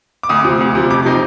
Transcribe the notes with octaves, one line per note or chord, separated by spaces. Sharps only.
D6
D2 D#6
C3 F3
D2
C3 F3
F2 D6
C3 F3 C4 D#4